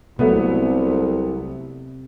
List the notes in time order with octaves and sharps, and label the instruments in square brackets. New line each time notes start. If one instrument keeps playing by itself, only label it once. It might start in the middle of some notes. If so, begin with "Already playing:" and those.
[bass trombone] C2 [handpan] C3 [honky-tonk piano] F#3 A3 B3